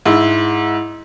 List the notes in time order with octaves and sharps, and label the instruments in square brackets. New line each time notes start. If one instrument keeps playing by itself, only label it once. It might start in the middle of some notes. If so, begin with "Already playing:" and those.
[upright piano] G#2 E4